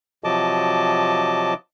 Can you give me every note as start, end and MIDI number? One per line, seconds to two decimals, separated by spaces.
0.24 1.54 48
0.24 1.54 53
0.24 1.54 54
0.24 1.54 75
0.24 1.54 81
0.24 1.54 86